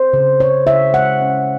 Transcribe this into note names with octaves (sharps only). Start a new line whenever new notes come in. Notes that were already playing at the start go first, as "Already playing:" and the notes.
Already playing: C5
C#3
C#3 C#5
C#3 E5
G#3 F#5
C#4